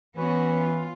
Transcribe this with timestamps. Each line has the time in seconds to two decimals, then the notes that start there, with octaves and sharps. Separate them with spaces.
0.17 E3 B3 C#4 F#4
0.59 F4